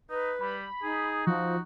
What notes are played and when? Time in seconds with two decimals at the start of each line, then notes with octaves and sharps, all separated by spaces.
0.10 D#4 B4
0.41 G3 B5
0.83 D#4 G#4
1.27 F3 F#4